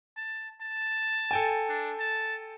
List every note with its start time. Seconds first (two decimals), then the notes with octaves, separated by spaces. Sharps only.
0.17 A5
0.61 A5
1.31 A4 G5 G#5
1.69 D4
2.00 A5